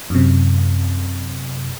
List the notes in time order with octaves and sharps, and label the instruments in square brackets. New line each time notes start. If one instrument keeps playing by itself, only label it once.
[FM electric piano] F#2 C3